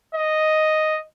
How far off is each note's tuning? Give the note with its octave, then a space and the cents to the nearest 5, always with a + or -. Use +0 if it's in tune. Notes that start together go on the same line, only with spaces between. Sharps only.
D#5 +0